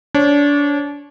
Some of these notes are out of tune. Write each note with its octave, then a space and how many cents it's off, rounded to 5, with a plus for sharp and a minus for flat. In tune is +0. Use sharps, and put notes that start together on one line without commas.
D4 -30 C#5 -25